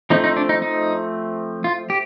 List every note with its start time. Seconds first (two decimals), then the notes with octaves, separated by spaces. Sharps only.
0.10 F3 A3 C4 D#4
0.24 D#4
0.37 D4
0.49 D#4
0.62 D#4
1.64 F4
1.90 G4